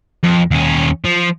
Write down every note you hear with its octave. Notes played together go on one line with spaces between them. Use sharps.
F2
D#2 C#4
F3